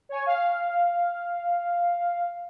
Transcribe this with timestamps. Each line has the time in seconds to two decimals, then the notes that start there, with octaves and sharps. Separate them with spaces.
0.09 C#5 G#5
0.26 F5